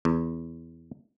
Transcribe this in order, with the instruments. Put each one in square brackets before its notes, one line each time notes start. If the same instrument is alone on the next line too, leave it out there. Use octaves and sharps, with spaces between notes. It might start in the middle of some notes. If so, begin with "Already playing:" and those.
[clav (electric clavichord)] E2